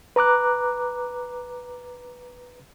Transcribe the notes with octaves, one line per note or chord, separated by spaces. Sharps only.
B4 A#5 D6 F#6